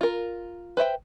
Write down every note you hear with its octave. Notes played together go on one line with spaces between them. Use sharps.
F4 A#4
B4 C5 E5 G5